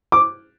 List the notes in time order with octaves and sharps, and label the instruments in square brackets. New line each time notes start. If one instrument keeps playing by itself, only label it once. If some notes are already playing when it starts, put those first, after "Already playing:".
[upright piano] D6